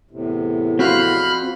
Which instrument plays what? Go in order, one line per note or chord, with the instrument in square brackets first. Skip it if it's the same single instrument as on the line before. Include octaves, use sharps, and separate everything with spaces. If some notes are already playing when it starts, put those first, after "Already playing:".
[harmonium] E2 A2 C3
[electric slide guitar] C4 F4 [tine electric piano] F#4 [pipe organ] B5 F6 F#6